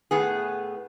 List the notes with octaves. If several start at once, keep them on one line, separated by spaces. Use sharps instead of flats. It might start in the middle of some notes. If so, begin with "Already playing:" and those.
A2 B3 G#4